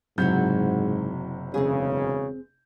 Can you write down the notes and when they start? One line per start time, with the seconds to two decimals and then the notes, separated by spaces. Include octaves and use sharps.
0.18 F#1 G#2 C3 F#3 E4 F#4 G6
1.54 E1 C#3 C4 G#4